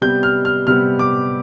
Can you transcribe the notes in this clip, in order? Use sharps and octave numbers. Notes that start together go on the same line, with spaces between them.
C3 G3 B3 G6
F6
F6
C3 G3 B3 F6
D6